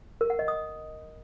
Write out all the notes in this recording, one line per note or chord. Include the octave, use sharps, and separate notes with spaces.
A#4
F#5
D#5
D#6